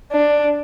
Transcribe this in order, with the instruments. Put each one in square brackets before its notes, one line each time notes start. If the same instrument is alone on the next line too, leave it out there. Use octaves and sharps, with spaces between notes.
[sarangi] D4